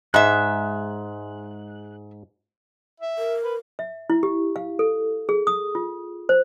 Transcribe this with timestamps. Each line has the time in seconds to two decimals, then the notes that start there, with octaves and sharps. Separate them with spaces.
0.14 G#2 G#3 E5 F#6
3.00 E5
3.18 A#4
3.44 B4
3.79 E5
4.10 E4
4.23 G4
4.56 F5
4.79 A4
5.29 G#4
5.47 D#6
5.75 F4
6.29 C5